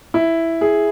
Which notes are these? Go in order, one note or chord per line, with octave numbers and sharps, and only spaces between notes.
E4
G#4